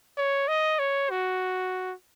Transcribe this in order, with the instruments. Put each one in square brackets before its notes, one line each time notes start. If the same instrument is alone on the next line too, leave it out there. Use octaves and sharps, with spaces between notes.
[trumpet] C#5
D#5
C#5
F#4